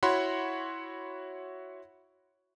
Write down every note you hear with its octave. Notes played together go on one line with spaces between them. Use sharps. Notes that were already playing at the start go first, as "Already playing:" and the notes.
E4 F#4 C#5 F#5 B5 C6